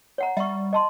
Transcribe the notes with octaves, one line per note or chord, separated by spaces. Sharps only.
C#5 F#5 A#5
G3 E5 C#6
D#5 A5 C6